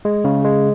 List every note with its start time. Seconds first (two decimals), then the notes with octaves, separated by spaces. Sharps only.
0.05 G#3
0.24 C#3
0.44 G#3